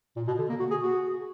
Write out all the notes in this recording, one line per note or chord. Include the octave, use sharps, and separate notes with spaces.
A#2
B2
D3
A#3
F#4
G#4
F#4